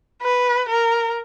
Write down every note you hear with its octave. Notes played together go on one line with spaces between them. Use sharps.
B4
A#4